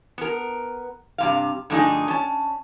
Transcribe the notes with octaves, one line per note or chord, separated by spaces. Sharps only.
B3 A#4
G2 C3 F5
G2 D3 F3 A3 D#4 G#4
C#4 A5